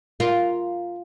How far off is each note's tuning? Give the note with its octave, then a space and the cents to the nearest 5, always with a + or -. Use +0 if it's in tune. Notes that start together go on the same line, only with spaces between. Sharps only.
F4 +0 A#4 +0